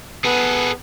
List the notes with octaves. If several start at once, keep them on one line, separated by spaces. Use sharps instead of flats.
B3 G#4 A4